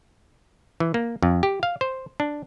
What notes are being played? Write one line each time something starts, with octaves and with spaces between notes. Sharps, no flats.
E3
A#3
F2
G4
F5
C5
D4